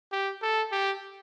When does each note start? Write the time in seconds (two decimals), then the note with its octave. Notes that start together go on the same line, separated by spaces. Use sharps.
0.12 G4
0.42 A4
0.72 G4